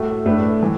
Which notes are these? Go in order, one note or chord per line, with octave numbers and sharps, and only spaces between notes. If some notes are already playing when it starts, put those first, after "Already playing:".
Already playing: A2 A3 F#4
A2 A3 D4 B4
E3